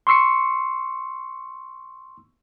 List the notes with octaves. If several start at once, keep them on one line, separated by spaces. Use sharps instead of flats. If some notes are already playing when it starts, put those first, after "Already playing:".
C6 C#6 E6 C7 C#7